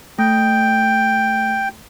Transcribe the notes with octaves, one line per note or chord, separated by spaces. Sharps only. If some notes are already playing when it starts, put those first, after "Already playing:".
A3 G5